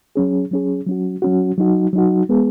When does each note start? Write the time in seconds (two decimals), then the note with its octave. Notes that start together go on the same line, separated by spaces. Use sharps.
0.16 F#3 C#4 G#4
0.51 F#3 C#4 G#4
0.87 F#3 C#4 F#4
1.22 F#3 C#4 F#4
1.58 F#3 D#4 F#4
1.93 F#3 D#4 F#4
2.29 G#3 B3 G#4